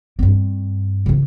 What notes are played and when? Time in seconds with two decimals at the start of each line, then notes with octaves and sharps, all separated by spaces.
0.19 G2 C4
1.06 C#3 E3